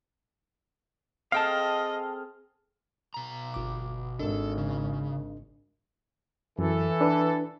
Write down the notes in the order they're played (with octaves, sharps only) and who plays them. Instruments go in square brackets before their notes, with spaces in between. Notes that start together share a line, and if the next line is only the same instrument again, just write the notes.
[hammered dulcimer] C4 G#4 A4 [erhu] D#5 [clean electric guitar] F5 G5 A5 [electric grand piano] F6
[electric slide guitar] B2 A#5
[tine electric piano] G1 D6
[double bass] G#1 [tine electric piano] D4 A#4 D#5 [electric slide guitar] A4
[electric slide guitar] C#3
[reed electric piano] F#2 [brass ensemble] E3 A4
[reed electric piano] D4 B4